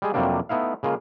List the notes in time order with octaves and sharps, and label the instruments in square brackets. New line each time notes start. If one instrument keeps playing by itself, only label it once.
[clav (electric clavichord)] G3 G#3 G#4
F2 C3 F#3 G3 A#3 D4
A3 B3 D#4 E4 F5
C#3 G#3 A#3 F4